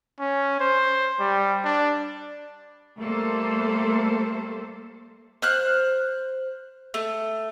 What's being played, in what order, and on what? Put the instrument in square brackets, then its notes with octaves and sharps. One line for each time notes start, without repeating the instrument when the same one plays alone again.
[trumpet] C#4
C5
G3
D4
[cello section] G3 A3 A#3 A4 C5
[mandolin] C5 F6 F#6
A3